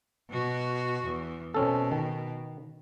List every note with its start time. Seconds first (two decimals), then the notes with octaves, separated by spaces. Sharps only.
0.30 B2 F#4
1.04 E2
1.54 B2 C4 C#4 A4
1.91 D#3